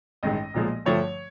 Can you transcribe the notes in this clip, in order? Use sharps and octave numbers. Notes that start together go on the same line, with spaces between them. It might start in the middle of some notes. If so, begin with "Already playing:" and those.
A1 G2 D#3 G#3 D#5
B1 A#2 F3 G#3
G2 D3 F3 A3 C#5